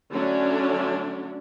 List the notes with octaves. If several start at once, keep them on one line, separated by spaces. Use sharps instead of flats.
D3 F#3 A3 C#4 D4